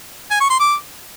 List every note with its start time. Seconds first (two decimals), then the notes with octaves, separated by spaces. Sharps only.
0.30 G#5
0.40 C#6
0.50 C6
0.60 D6